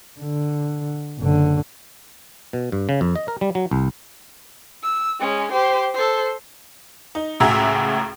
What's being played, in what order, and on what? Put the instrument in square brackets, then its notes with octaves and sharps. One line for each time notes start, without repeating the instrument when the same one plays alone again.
[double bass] D3
F#1 D3
[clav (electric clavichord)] B2
G2
C#3
F2
D#5
A#4
G3
F#3
C2
[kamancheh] E6
G#3 C#4
G4 C5
A4 C5
[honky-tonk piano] D#4
C#2 A2 F#4 G#4 E5 A#5